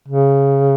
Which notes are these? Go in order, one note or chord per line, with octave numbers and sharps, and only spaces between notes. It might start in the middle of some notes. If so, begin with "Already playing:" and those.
C#3